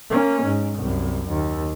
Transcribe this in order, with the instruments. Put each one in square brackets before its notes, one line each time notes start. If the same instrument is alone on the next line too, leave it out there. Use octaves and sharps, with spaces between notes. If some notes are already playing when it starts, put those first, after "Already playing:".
[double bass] A#3 C#4
G#2
C2 F#2
D#2